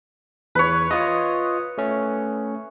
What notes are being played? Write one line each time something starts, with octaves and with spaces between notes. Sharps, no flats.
E2 B4 C#5
F4 D#5 D#6
A3 C#4